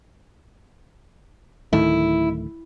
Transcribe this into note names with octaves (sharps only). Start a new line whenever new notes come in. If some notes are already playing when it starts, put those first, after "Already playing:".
D1 D#3 A3 E4